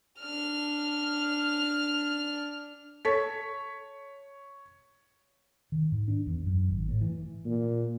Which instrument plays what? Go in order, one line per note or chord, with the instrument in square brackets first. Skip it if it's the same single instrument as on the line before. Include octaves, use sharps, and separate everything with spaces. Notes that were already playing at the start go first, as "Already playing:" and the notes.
[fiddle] D4 F6
[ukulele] A4 [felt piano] C#5 B6
[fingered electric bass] D#3
G#2
D4
E2
F#2
G#1
A2
E3
[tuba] A#2